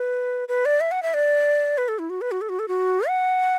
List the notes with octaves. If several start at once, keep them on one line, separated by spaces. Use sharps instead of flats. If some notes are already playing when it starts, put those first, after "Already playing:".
Already playing: B4
B4
D5
E5
F#5
E5
D5
B4
A4
E4
F#4
B4
F#4
A4
F#4
A4
F#4
F#5